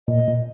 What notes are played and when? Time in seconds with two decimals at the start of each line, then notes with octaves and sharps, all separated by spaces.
0.08 A#2 D#5
0.28 A#2